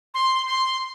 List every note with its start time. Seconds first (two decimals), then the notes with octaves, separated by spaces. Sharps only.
0.14 C6
0.47 C6